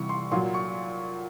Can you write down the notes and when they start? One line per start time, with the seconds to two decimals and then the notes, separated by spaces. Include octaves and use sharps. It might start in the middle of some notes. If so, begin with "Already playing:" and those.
Already playing: C3 E3 G3 C#6
0.09 C6
0.32 A#2 F#3 C6
0.54 C#6